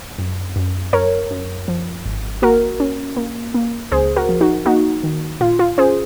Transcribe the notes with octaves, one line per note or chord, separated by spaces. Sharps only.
F#2
F#2
F#2 A#4 C#5
F#2
F3
G#1
A#3 F#4 A#4
C#4
A#3
A#3
C#2 G#4 C5
F#4 A#4
F3
D#4 F#4
A#3 D#4 F#4
D#3
A#2 F4
F4
C#4 G#4 C5